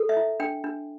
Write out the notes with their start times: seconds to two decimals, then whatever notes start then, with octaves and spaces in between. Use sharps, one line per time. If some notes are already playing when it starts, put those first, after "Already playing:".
Already playing: A4
0.09 E5
0.17 E4
0.40 D4 G5
0.64 D4